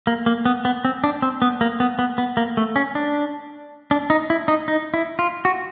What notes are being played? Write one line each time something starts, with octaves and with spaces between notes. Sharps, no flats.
A#3
A#3
B3
B3
C4
D4
C4
B3
A#3
B3
B3
B3
A#3
A3
C#4
D4
D4
D#4
E4
D#4
D#4
E4
F4
F#4